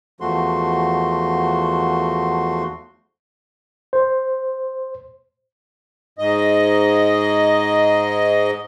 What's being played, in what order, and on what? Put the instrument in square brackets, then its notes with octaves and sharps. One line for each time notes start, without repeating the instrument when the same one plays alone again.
[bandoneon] E2 F3 A3 F#4 C6
[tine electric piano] C5
[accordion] G#2 D#5